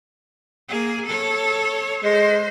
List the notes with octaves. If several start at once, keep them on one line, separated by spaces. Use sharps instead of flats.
A#3 G#4
A4 C#5
G#3 C5